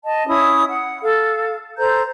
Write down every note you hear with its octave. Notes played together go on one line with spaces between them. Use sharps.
D#5 A5
C#4 E4 D#6
F#5
A4 F5
A4 C5 A#5 G6